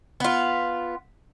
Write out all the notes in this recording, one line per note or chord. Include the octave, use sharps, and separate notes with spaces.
B3 F4